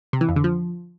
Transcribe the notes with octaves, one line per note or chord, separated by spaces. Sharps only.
C3
E3
F2
D3
F3